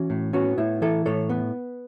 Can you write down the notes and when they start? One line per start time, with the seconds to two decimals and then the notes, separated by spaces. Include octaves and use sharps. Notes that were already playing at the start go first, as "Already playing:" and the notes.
Already playing: E3 C#4 F#4
0.10 A2
0.33 B3 C#4 F#4
0.58 A2 E4
0.82 E3 E4 A4
1.06 A2 A4 C#5
1.30 B3